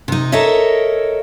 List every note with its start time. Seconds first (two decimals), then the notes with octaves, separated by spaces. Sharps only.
0.08 C3 D#4
0.32 A4 A#4 C#5 D#5 E5